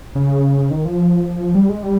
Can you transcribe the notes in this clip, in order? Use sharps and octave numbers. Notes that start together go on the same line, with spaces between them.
C#3
D#3
F3
G3
G#3
G3